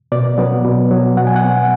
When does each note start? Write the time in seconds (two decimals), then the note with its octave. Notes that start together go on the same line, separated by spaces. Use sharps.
0.12 B2 D5
0.38 F#3 B3
0.64 B2
0.91 F#3 B3
1.17 B2 F#5
1.27 G#5
1.36 F#5
1.43 F#3 B3